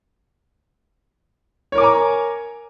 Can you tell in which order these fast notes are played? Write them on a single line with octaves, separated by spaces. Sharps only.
C#5 A#4 D6 G#5 A#5